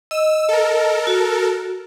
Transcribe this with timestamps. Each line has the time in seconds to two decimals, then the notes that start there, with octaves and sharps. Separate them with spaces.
0.11 D#5 E6
0.49 A4 A#4
1.07 F#4